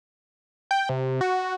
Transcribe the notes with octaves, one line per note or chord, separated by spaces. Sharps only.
G5
C3
F#4